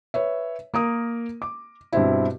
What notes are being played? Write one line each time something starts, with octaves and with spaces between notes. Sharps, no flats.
B4 C#5 E5
A#3 A#4 D#6
D6
G2 B2 C4 E4